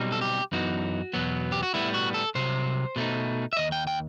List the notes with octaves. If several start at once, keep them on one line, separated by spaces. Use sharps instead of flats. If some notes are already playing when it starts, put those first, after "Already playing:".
Already playing: B1 B2 G3 C4 D#4
A4
G4
F#2 E3 B3 D#4 F#4
E2 B2 F#3 B3
G4
F#4
A2 G3 B3 E4
F#4
A4
C2 C3 F#3 C5
B2 A3 D#4
E5
D#2 D#3 D#5
G5
G5